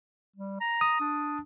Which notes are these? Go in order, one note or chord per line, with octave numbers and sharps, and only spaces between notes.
G3
A#5
D#6
D4